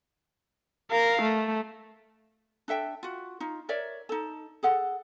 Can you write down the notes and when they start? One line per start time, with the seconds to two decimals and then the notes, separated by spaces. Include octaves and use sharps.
0.91 A#4 F5
1.22 A3
2.68 D4 A4 E5 G5
3.03 F4 F#4
3.40 D#4 F4
3.69 A#4 C#5 D5 E5
4.09 D#4 A4
4.63 G#4 A4 F#5